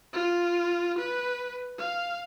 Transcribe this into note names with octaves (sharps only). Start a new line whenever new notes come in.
F4
B4
F5